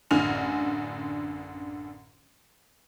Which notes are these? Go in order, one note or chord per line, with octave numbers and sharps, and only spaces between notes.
A1 F#2 D3 G#5 F6 F7